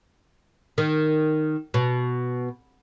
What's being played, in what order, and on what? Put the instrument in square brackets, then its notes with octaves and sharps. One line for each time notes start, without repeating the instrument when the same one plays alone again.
[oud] D#3
B2